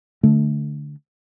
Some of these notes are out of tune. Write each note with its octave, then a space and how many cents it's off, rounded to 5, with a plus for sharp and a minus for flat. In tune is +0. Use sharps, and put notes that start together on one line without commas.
D3 +0 A3 -10